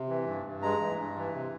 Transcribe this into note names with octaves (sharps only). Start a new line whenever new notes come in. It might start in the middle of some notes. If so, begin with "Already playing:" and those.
Already playing: C3
E3
G2
G2
G#3 A#5
E3
G2
E3
C3